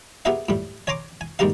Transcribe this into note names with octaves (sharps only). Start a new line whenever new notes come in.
B3 G4 G#4 A#4 E5 F5
A2 G3
C#5 G#5 A#5 C6 D6
G#5
D#2 G#2 G3 G4 A#4 F5